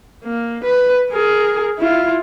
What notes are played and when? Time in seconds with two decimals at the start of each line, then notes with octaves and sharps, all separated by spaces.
0.24 A#3
0.64 B4
1.10 G#4 A#4
1.79 E4 F4